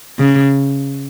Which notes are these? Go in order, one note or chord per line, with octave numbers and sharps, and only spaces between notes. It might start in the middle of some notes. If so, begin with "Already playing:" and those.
C#3